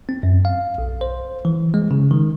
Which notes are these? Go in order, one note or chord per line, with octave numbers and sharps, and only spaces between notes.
C4
F#2
F5
B1
C5
E3
G#3
C#3
D#3